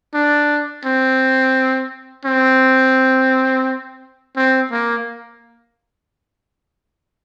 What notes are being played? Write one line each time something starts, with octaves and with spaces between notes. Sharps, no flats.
D4
C4
C4
C4
A#3